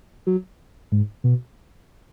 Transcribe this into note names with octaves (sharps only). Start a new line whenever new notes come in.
F#3
G#2
B2